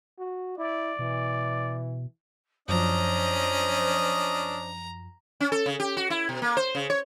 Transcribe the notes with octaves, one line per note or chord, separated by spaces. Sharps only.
F#4
E4 D5
B2 E3
F#2 F3 C#4 D4 C5 D#5 A#5
C#4
A4
C#3
G4
F#4
E4
B2
A#3
C5
C#3
C#5